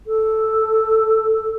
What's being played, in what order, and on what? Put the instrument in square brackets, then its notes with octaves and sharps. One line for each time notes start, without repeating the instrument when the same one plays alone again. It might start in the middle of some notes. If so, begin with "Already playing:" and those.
[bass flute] A4